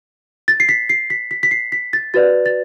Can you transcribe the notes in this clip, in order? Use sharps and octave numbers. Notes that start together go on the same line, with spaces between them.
A6
C7
B6
C7
B6
B6
B6
C7
B6
A6
F#4 B4 D5 A6
A6